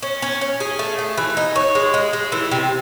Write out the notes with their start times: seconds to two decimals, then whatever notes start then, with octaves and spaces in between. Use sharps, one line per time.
0.02 C#4
0.22 C#4
0.41 C#4
0.60 G#4
0.79 A3
0.99 A3
1.17 E3
1.37 D#4
1.56 C#5
1.75 G#3
1.94 G#3
2.13 G#3
2.32 E3
2.51 C3